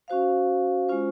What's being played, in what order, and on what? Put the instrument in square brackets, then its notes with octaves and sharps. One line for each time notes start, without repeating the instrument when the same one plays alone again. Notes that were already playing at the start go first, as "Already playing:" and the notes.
[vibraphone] C#4 F#4 C5 F5
G#3 C#4 F4 C5